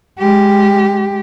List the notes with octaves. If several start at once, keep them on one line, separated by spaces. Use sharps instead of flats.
G#3 G4